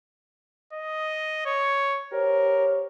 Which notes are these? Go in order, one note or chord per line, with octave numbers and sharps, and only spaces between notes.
D#5
C#5
G4 A#4 C5 C#5